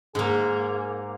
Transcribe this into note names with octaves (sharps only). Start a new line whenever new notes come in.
G#2 A#3 G#4